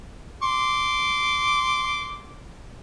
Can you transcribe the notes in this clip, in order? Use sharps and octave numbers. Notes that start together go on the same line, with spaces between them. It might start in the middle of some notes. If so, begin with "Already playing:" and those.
C6 D6